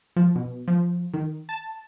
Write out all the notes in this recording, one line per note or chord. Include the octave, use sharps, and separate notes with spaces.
F3
B2
F3
D#3
A5